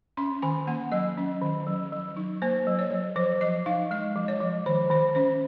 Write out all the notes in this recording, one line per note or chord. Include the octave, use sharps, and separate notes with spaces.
C#4 C6
D#3 G#5
A#3 F#5
F#3 D#5
C#4
D#3
F#3
F#3
D#4
A#3 C5
F#3
C#5
F#3
F3 C5
F3 D#5
D#4 F5
G#3 D#5
F3
C#5
F3
D#3 C5
D#3 C5
C#4 C5